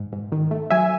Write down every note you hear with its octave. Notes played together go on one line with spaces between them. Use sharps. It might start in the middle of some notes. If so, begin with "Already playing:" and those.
Already playing: G#2
G#2
D#3
A3
F#3 E5 G#5